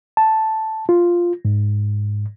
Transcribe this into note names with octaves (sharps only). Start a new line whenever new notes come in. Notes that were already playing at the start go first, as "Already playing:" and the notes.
A5
F4
G#2